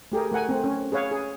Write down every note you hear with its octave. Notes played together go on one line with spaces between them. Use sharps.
A3 G4 G#4 A#4
A3 A#4 F#5 G#5
A3 C4
C#4
G#4 B4 C#5 F5
G#4